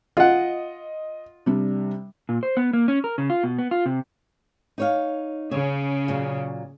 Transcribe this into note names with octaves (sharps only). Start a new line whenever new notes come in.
F4 D#5 F#5
C3 G3 D4
A#2
C5
B3
A#3
C#4
A#4
C#3
F4
B2
B3
F4
C3
D#4 C#5 F5
C#3 C#5
A#2 F#3